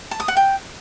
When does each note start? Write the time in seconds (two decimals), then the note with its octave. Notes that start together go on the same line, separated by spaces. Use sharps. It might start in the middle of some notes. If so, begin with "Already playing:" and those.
0.11 A5
0.20 D#6
0.28 F#5
0.37 G5